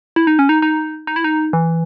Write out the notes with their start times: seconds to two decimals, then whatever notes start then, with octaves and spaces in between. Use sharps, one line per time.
0.16 E4
0.27 D#4
0.39 C#4
0.49 D#4
0.62 D#4
1.07 D#4
1.16 E4
1.24 D#4
1.53 E3